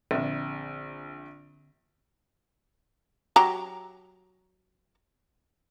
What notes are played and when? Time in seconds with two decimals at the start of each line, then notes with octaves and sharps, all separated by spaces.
0.11 A#1 D3 C4 E5
3.36 F#3 G4 A#5